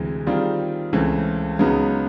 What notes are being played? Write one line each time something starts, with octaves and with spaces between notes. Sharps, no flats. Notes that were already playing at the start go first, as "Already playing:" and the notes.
Already playing: D2 C3 E3 G#3
D#3 G3 C4 F4 G#4
C#2 C#3 E3 A3 C4
C#2 C#3 F#3 B3 D#4